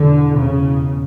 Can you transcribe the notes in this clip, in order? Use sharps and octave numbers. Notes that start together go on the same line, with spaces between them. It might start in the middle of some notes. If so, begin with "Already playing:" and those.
Already playing: E2 B2 D3
C#3